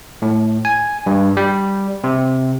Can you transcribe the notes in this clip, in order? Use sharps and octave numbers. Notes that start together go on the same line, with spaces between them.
A2
G#5
G2
G3
C3